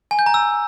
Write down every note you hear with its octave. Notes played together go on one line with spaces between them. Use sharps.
G#5
G6
A#5
E6